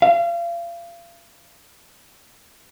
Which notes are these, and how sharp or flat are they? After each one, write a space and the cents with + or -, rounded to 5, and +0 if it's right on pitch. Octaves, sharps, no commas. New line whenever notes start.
F5 -35